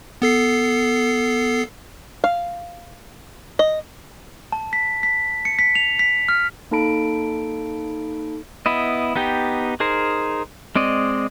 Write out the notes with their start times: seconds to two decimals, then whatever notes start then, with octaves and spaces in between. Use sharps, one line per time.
0.22 B3 A4 C7
2.24 F5
3.59 D#5
4.52 A5
4.73 B6
5.03 B6
5.45 C#7
5.59 B6
5.75 F7
5.99 B6
6.29 F6
6.71 A#3 D#4 A4 A5 B5 D7
8.66 B3 E4 D#5
9.16 B3 D#4 G4 G5
9.80 D#4 G#4 A#4 C5
10.76 G#3 C4 D5 D#5